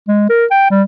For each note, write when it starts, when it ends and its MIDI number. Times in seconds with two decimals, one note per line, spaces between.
0.08 0.25 56
0.30 0.46 70
0.51 0.69 79
0.71 0.83 55